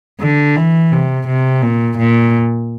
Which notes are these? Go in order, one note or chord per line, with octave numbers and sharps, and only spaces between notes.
D3
E3
C3
C3
A#2
A#2